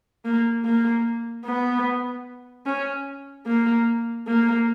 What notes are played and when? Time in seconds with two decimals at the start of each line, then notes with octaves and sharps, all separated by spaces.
0.25 A#3
0.64 A#3
1.45 B3
2.66 C#4
3.47 A#3
4.27 A#3